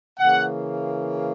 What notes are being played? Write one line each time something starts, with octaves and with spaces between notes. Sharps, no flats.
C#3 E3 A#3 F#5